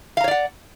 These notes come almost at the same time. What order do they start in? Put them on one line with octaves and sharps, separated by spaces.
F5 A#5 C#5 D5 F#5